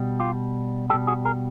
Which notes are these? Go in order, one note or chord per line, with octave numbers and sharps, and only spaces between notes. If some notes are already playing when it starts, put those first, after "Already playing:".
Already playing: B2 G3
F4 G4
B2 G3 G4 A4
F#4 G#4
G#4 A#4